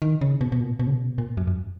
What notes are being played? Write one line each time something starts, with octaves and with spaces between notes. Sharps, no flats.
D#3
C#3
B2
B2
A#2
B2
C#3
B2
A#2
F#2
F#2